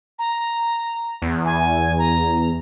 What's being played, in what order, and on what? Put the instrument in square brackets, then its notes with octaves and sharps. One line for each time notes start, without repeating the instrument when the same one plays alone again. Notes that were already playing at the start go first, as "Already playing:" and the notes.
[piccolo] A#5
[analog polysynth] E2
[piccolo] G#5
A#5